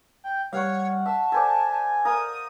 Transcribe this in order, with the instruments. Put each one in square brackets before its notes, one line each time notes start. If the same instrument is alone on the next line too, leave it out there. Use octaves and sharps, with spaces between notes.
[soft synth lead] G5
[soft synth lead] G3 [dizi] C#5 [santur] F5 F#5 C#6
[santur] E5 [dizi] A5
[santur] A4 C5 D5 [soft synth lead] G#5
[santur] A#4 F5 [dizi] D#6